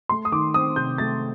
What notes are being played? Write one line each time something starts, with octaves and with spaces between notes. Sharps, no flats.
A3 C6
D#6
D#3 D6
C4 D#6
C3 G6
A3 A6